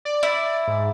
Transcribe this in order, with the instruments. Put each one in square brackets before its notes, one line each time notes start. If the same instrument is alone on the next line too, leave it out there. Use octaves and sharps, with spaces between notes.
[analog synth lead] D5
[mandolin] E4
[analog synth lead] G#2